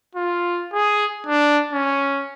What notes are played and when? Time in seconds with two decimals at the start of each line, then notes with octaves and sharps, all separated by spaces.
0.15 F4
0.73 G#4
1.27 D4
1.73 C#4